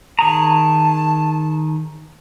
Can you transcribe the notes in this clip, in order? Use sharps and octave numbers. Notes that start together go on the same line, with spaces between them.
D#3 G#4 A5 A#5